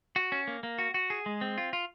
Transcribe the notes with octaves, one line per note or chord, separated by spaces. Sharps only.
F#4
C#4
A#3
A#3
F#4
F#4
G#4
G#3
C4
F4
F4